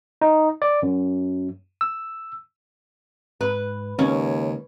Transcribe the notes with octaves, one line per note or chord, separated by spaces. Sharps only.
D#4
D5
F#2
E6
G#2 B4
D#2 C#3 G#3 C#4